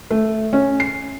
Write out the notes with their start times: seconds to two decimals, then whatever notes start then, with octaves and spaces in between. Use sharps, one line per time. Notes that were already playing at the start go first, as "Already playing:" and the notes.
0.11 A3
0.53 C#4
0.80 C7